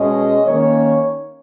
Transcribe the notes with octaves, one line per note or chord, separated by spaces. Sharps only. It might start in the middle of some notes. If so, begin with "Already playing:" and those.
Already playing: B2 G#3 C#4 D#5
D#3 A#3 C#4 C#5